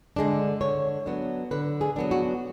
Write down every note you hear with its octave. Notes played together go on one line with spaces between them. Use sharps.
D3 G#3 D4
D3 C#5
F#3 B3 D4
D3 B4
G#4
F#3 B3 D4
F#4